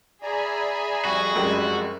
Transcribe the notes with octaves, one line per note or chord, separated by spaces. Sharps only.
G#4 D5 E5 G#5 A#5 B5
F2 G3 F#4
F#2 G#3 G4